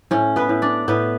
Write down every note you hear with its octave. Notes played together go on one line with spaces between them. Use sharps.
A2 C#4 C#5
B3 B4
A2
D4 D5
A2 B3 B4